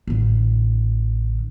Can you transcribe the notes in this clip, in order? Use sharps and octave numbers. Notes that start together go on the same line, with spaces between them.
A1 D3